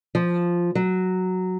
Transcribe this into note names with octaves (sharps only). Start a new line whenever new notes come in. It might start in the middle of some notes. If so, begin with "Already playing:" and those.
F3
F#3